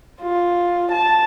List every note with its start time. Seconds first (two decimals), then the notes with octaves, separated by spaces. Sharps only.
0.22 F4
0.92 A5